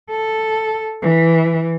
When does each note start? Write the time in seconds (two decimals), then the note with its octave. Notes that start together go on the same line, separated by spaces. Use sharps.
0.10 A4
1.02 E3